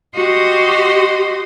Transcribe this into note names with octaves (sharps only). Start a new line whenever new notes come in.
F#4 G4 D#5 C6